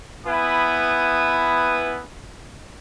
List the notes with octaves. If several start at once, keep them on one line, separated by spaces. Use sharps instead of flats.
B3 E4 B4 G#5 D#6